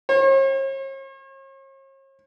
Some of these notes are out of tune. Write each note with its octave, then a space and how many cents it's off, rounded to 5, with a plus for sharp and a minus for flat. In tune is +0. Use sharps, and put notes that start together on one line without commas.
C#5 -45